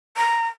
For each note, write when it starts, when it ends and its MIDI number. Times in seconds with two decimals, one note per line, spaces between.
0.17 0.47 82